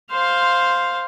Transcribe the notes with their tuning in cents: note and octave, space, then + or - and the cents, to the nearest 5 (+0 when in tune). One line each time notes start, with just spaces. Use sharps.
C5 +0 F5 +0